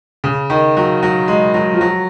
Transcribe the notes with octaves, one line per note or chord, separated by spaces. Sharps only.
C#3
D#3
F#3
F#3
G#3
F#3
F3
F#3